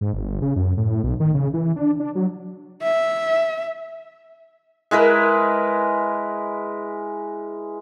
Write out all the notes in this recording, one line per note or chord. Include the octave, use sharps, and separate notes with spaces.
G#2
G1
C#3
F#2
A2
B1
D#3
C#3
E3
D4
D4
F#3
E5
G#3 E4 A#4 B4